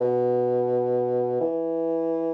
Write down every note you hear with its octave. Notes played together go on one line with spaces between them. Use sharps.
B2
E3